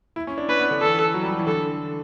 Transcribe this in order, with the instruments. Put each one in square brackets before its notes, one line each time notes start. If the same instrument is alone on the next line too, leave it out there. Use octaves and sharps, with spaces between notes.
[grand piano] E4
C#4
D4
[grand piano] C#4 [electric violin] B4
[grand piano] B3
D3
[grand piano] E3 [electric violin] A4
[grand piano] F#3
G3
F#3
E3
[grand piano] D3 [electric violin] A4